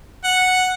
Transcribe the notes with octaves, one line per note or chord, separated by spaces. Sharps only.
F#5